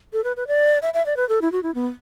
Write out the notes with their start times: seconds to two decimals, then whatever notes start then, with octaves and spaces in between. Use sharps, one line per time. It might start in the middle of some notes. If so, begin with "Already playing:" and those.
0.13 A4
0.24 B4
0.37 B4
0.47 D5
0.82 E5
0.94 E5
1.06 D5
1.17 B4
1.29 A4
1.42 E4
1.52 F#4
1.63 E4
1.75 B3